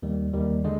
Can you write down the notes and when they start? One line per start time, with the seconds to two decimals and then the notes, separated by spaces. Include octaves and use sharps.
0.02 D#2 D#3 G3
0.33 D#2 D#3 G3
0.64 D3 G#3